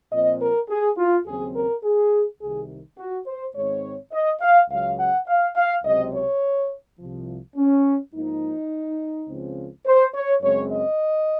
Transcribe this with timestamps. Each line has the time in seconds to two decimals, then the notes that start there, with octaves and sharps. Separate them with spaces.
0.11 A#2 F3 C4 D#5
0.40 A#4
0.69 G#4
0.97 F4
1.26 D#2 C#3 F#3 C4 G#4
1.55 A#4
1.83 G#4
2.41 C2 C3 D#3 G#4
2.98 F#4
3.26 C5
3.55 G#2 D#3 G#3 C4 C#5
4.12 D#5
4.41 F5
4.70 C#2 C#3 F#3 F5
4.99 F#5
5.27 F5
5.56 F5
5.84 C#2 C3 F#3 C4 D#5
6.13 C#5
6.99 C2 C3 F3
7.56 C#4
8.13 G#2 F3 A#3 D#4
9.28 C#2 C#3 F3 C4
9.86 C5
10.14 C#5
10.42 F#2 C#3 G#3 C4 C#5
10.71 D#5